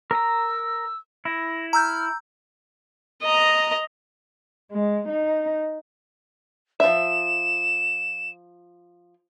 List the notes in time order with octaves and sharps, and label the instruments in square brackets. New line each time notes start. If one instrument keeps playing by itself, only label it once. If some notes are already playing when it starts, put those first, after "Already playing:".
[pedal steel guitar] A#4 A#5 [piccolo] E6
[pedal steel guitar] E4 [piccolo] A#6
[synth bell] A#5 E6 G6 [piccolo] F6
[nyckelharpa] D#5 A#5
[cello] G#3
D#4
[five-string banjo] F3 E5 [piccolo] E7